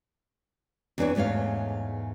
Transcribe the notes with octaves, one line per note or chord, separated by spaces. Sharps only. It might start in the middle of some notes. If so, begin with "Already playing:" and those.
E2 E3 C4 D4 B4 C#5
E2 G#2 A3 C#5 F5